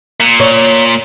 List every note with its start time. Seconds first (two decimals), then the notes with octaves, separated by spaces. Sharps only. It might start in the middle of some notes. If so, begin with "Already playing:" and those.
0.21 A#2
0.40 C#5